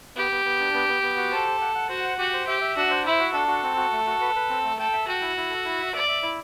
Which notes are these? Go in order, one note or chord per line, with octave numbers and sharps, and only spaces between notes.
B3 G4
B3
B3
D4
B3
B3
B3
F#4
A4 C5
G4
F#5
F#5
F#4 C5
F#5
F#4 G4
C5
G4 E5
E5
D4 F#4
C5
E4 E5
F#4
D4 A4
F#4
C4
F#4
A3
F#4
B4
B4
C4
A3
A4 G5
E5
F#4 G5
E4
E4
A4
E4
E5
D5 E5
E5
E4